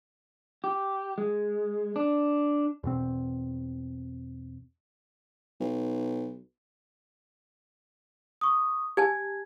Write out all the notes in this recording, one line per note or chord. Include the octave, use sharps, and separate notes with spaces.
G4
G#3
D4
E2 B2 C4
B1
C#6 D#6
G4 G#5 A5 G#6